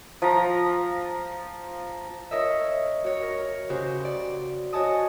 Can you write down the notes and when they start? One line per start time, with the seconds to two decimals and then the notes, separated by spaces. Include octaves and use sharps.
0.22 F3 A#5
2.31 A#4 C#5 D#5 E5
3.04 F#4 C#5
3.23 A#4
3.70 C#3 F#4 G4 C5
4.05 D5
4.73 F#4 C#5 D#5 G#5 A5 D#6